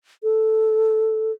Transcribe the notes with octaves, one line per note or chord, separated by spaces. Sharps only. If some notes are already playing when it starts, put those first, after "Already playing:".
A4